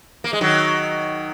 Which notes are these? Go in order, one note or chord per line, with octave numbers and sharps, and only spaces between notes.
A#3
G#3
D#3 F#3